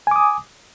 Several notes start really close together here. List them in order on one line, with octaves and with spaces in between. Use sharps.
G#5 D6 D#6